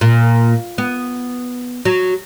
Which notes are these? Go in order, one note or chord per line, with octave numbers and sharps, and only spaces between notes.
A#2
B3
F#3